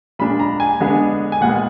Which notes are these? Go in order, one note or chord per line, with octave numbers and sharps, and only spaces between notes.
A#2 G#3 D4 B5
A#5
G#5
D3 G#3 B3 D4
G#5
A#2 G#3 B3 F#5